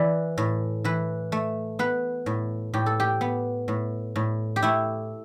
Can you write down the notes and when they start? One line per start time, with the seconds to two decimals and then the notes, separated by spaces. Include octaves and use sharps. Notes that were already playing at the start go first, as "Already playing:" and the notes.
Already playing: E3 B4 D5
0.38 A2
0.84 E3 B4
1.32 A3
1.79 B3 B4
2.26 A2
2.74 A2 G4
2.86 A4
3.00 G4
3.21 B3
3.68 A2
4.16 A2
4.56 G4
4.62 A3 E4